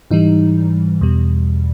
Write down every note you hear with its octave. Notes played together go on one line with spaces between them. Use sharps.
G#2 E3 G3 D#4
E2 B2 G3